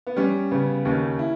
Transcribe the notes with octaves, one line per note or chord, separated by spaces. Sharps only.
B3
G3 C#4
C#3 B3
D#2 C#4
E4